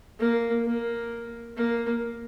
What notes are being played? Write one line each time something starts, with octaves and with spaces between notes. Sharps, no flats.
A#3
A#3
A#3